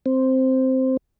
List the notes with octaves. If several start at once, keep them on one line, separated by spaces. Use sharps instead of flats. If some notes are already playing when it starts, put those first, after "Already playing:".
C4